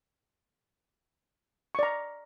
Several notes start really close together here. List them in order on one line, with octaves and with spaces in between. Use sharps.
C#6 D5 A#5